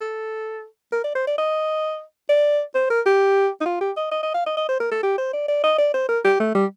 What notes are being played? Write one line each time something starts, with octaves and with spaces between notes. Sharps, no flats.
A4
A#4
D5
C5
D5
D#5
D5
C5
A#4
G4
D#4
F4
G4
D#5
D#5
D#5
F5
D#5
D#5
C5
A#4
A4
G4
C5
D5
D5
D#5
D5
C5
A#4
G4
A3
G3